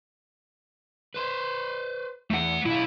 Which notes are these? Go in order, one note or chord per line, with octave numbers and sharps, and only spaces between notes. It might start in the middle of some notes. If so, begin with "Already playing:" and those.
B4 C5
E2 A3 F#5
B1 E4 F4